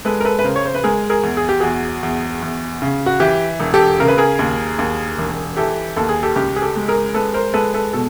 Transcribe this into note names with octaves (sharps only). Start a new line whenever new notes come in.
G#3 A4 B4
A#4
A4 B4
B4
C#3 A#4 C5
C#5
C5
B4
G#3 G#4 A#4
G#4 A#4
E2
G#4
G4
E2 F#4 G#4
E2
E2
C#3
F#4
E3 G4
E1
G4 A4
C#3 A#4
B4
G#4 A#4
D#2
D#2
E1
E3 G4 A4
D#2 A4
G#4
G4 A4
C#2 G4
G#4
G4 A4
G#3
G#4 A#4
G#3 A4 B4
A#4 C5
G#3 A4 B4
A4 B4
B2 A4